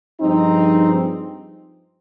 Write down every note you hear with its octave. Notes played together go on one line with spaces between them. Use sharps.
G2 F3 G#3 C4 D#4